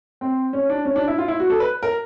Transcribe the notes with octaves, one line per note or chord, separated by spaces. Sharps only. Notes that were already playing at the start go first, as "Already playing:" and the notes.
C4
C#4
D4
C#4
D4
E4
F4
E4
F#4
A4
B4
A#4